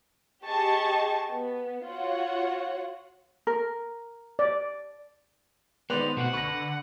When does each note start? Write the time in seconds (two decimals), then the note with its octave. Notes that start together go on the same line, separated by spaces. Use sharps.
0.45 G4 G#4 D#5 A5 C#6
1.32 B3
1.86 F4 F#4 C#5 F#5
3.47 A#4
4.39 D5
5.90 D#3 G#3 B3 B4 C5 D5 F7
6.17 B2 A3 C4 F#4 F#5
6.33 D3 B4 C#6 A#6